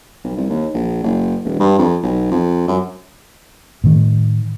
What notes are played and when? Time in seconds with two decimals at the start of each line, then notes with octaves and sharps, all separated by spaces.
0.24 B1
0.37 C2
0.49 D#2
0.74 A#1
1.04 F#1
1.45 E1
1.60 G2
1.79 F2
2.03 B1
2.31 F2
2.68 F#2
3.84 A2 D#3